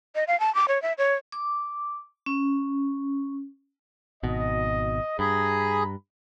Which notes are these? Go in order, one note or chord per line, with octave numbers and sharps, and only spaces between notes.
D#5
F5
A5
D6
C#5
E5
C#5
D6
C#4
G#1 B2 D#5
G2 G#4 A#5 B5